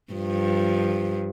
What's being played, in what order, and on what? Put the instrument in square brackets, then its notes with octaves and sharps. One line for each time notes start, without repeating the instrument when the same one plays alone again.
[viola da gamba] G2 F3